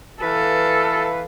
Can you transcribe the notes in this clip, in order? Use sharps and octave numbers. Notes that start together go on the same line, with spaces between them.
E3 A4 B4 F5